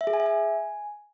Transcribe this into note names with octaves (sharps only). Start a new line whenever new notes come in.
E5
G#4
G#5
E5
G#5